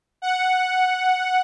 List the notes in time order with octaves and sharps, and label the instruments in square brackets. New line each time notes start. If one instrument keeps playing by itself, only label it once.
[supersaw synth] F#5